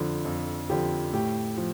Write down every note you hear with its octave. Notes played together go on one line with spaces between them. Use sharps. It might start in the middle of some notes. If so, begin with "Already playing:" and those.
Already playing: F2 D3 F3
F2
D3 F3 G4
A2 G4
F3